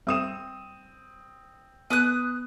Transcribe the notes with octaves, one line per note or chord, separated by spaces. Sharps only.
G3 C4 D#6 E7
B3 B4 D#6 F#6